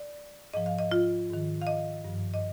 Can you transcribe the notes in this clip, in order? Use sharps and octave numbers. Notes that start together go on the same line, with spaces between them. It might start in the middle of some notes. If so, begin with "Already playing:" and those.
Already playing: D5
G#2 F3 D#5
F5
D#5
F4
G#2 D#3
F5
D#5
G2 F3
D#5